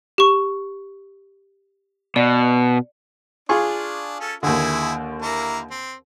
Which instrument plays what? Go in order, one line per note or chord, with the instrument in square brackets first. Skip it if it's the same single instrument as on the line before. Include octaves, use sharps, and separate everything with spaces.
[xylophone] G4 C#6
[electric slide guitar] B2 [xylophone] D5
[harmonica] D4 [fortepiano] F4 G#4 C#6
[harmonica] C#4 A4
[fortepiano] D#2 D3 [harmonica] E4 G#4
[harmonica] A#3 E4 A#5
C4